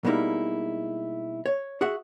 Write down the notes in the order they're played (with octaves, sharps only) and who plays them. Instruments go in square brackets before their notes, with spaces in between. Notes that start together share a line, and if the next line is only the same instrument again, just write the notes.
[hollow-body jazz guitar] B2 G3 G#3 A#3 D#4 E4
C#5
F#4 G#4 E5 F#5